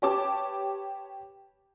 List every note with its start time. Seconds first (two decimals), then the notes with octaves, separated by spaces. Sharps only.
0.02 G4 B4 C#5 G5 A5 D6